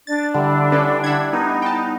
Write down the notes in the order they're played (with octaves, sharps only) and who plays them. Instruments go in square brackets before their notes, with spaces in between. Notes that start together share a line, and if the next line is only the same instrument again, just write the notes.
[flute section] D4 [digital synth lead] A6
[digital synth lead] D3 [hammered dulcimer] G3 E4
[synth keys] C#4 A4 B4
E5 F#5 G#6
[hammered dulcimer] B3 B4 [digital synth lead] D#4
[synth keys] G5 A5